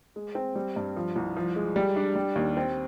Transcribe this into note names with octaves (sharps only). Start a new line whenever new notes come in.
G#3
C4
G3
G2
F3
C2
F3
G#3
G3
D4
G3
D#2
C4